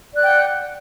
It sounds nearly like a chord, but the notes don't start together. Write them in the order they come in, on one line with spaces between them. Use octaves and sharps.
D5 F#6 G5 F#5